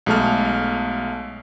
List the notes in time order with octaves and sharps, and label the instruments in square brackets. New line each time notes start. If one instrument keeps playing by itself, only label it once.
[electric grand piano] B1 G#3 A3 A5 F6